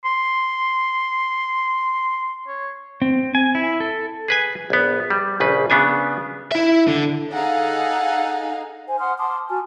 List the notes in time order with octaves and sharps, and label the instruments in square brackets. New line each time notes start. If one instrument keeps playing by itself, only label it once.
[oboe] C6
C#5
[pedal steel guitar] C4
G#5
E4
A4
[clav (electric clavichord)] G#4 B4 G#5
A#1 B3
G3
A#1 C#3 B4
C#3 B3 D4 G#5
[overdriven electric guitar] E4 E5
D3
[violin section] D#4 G#4 F5 [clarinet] A4 [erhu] F#5
[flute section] C5 G#5
F#5 C6 D#6 F6
A5 C6 D6 D#6
F#4 G#5 A5 F6